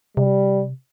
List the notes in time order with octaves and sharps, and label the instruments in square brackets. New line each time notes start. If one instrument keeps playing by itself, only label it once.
[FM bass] C3 [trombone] G3